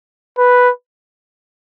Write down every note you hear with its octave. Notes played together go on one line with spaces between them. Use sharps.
B4